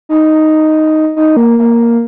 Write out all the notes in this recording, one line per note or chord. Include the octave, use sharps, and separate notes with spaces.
D#4
D#4
A#3
A#3